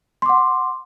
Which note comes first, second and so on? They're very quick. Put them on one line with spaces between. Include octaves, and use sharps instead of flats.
C6 D6 F#5